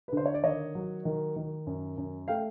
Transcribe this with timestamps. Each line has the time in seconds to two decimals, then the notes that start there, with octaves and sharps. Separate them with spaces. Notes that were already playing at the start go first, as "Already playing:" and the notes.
0.08 B4
0.12 D3 C5
0.26 C#5
0.34 D5
0.44 D#3 C#5 D#5
0.75 F#3
1.05 D#3
1.36 D#3
1.67 F#2
1.97 F#2
2.28 A3 F5 G5